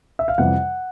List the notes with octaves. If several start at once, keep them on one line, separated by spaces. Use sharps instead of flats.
E5
F5
F2 C3 E3 G3 F#5